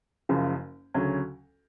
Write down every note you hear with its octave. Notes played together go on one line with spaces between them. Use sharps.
F#1 F#2 C#3 F3
D2 C#3 F#3 C#4